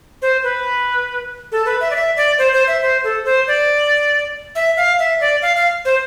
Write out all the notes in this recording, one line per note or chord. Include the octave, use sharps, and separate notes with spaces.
C5
B4
A4
B4
E5
D5
E5
D5
C5
C5
E5
C5
A4
C5
D5
E5
F5
E5
D5
F5
F5
C5